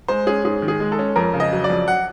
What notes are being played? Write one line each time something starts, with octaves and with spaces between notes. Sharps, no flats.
G#3 C5
C#4 G#4
G#2 G#4
D#3
G#4
G#3
A4
C#4
F2 A#4
C#3
D#5
F#3
D5
F2
F#5